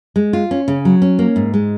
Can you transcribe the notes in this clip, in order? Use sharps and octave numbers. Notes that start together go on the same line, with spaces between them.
G#3
F4
C#4
C#3
F#3
C#4
A#3
G#2
G#3